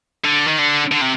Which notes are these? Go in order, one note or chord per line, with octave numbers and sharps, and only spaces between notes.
D3
D#3
D3
D3
C3